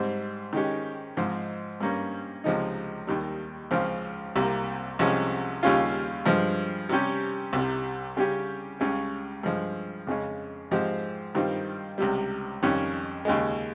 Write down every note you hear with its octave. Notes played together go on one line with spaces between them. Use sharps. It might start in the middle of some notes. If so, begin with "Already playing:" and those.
Already playing: G#2 G3 C4
D#3 G#3 C#4 G4
G#2 F3 C4 D#4
G2 G3 A#3 C#4
C#2 C3 F3 G#3 D#4
D#2 D#3 G3
C#2 C#3 F3 C4 F4
C2 C3 G3 A#3
C2 C3 F3 G#3 C#4
D#2 C#3 G3 C#4 F4
G2 F3 G#3
C3 G3 C#4 G4
C2 C3 G3
C#3 G3 C#4 G4
C#2 C#3 G3 C#4
G2 F3 G#3
F2 C#3 G#3 C#4
G#2 F3 G#3 C4 G4
G2 D#3 G3 C4 F4
C#2 C3 G3
F2 D#3 G3 C#4
D#2 C#3 G#3